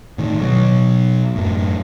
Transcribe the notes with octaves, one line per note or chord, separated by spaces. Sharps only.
A2 D#3
B2 F#3
F#2 A2